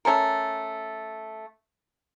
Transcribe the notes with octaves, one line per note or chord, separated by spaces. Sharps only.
A3 C#4 A4 A#4